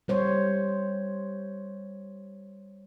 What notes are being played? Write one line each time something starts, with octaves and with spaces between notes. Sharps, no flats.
G3 C5 C#5